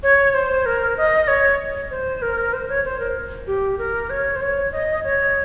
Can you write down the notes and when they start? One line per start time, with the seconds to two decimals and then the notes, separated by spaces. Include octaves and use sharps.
0.03 C#5
0.34 C5
0.66 A#4
0.98 D#5
1.28 C#5
1.91 C5
2.22 A#4
2.53 C5
2.69 C#5
2.85 C5
3.00 A#4
3.47 G4
3.79 A#4
4.10 C#5
4.36 C5
4.41 C#5
4.72 D#5
5.04 C#5